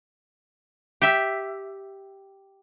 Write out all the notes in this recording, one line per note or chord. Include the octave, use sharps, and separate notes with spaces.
G4 E5